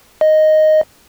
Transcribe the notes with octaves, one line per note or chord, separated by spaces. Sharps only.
D#5